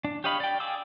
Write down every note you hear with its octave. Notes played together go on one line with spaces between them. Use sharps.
D4
G4 C#5 D#5 F5 B5
D5 G5
G#4 F5 G5 D6 E6